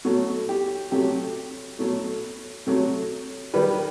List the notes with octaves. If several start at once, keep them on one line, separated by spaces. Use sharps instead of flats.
B2 F#3 A3
G4
C3 F#3 A3 G4
B2 F#3 A3
C3 F#3 A3
D#3 G3 B4